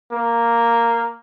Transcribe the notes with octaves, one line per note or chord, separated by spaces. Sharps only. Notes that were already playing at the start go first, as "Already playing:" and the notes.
A#3